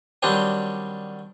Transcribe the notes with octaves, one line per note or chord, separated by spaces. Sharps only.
D#3 F#3 G3 C4 D4